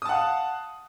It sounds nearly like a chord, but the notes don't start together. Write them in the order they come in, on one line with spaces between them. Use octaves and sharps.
D#6 A5 F#5 F5